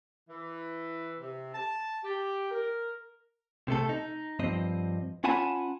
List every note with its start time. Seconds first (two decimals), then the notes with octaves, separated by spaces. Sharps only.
0.28 E3
1.20 C3
1.53 A5
2.04 G4
2.51 A#4
3.68 C3 A3 A4
3.89 D#4
4.39 G2 F3 C4 D#5
5.24 C#4 F4 F#5 G#5 A5 B5